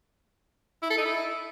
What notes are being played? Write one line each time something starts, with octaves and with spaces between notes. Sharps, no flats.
E4
A4
D#4
E4